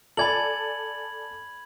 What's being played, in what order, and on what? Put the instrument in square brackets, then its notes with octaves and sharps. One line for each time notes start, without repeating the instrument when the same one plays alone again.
[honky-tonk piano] A4 D5 G#5 [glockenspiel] B5 G#6 F#7